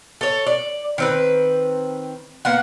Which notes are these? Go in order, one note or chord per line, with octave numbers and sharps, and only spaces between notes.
A4 C#5
D5
D#3 C4 B4
A#3 B3 F#5